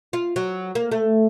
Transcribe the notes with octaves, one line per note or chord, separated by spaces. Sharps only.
F4
F#3
A#3
A3